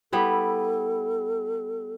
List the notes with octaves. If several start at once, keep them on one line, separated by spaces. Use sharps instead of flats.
G3 B3 E4 A4